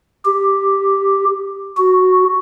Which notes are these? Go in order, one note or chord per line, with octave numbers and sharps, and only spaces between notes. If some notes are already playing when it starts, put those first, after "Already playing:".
G4
F#4